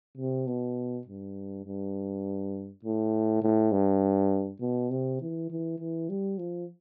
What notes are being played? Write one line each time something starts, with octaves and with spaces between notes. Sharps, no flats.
C3
B2
G2
G2
A2
A2
G2
B2
C3
E3
E3
E3
G3
F3